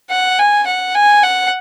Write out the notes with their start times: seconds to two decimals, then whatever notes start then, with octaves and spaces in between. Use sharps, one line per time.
0.10 F#5
0.39 G#5
0.67 F#5
0.95 G#5
1.23 F#5